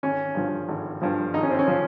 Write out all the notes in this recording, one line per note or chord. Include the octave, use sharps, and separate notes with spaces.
G#1 C#4
G2 F3
G#1
G2 F3
G#1 D#4
C#4
C4
C#4
F3